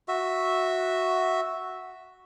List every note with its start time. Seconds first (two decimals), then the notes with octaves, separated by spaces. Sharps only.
0.08 F#4 E5